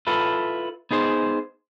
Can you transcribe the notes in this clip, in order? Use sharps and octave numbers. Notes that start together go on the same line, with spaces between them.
E4 F4 A4 B4
B3 D#4 G#4 C5